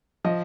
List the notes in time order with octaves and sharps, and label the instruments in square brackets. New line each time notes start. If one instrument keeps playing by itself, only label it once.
[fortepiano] F3 D#5